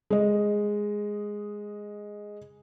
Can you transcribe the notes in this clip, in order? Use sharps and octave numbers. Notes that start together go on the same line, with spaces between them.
G#3 D#5